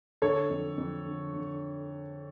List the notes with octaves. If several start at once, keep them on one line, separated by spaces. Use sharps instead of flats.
D3 A4 C#5
F2
F2
D3
D3